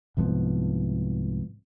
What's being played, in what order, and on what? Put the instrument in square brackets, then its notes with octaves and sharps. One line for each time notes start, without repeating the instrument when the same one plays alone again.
[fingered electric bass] C2 G#2 F3 B3